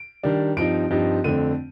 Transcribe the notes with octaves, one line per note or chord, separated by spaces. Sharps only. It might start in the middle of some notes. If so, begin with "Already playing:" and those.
Already playing: D7
D#3 G3 D4
G2 F3 C4 D#4 D7
G2 F3 C4 D#4
F2 D3 A3 C4 D#7